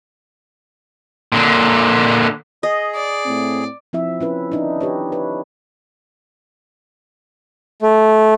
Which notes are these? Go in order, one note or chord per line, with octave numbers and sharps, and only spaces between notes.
A#2 D3
G#4 D#5
D5
A2 A3 C4
F3 C4 E4 E5
C#4 E4 B4
D4 D#4
G4 B4 C#5
B4 C#5
A3